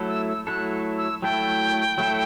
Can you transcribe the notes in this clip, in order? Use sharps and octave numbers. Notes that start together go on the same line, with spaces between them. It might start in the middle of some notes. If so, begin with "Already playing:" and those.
Already playing: F#3 A3 E4 A4
E6
E6
F#3 A3 E4 A4 F#6
E6
F#3 A3 E4 A4 G5
F#3 A3 E4 A4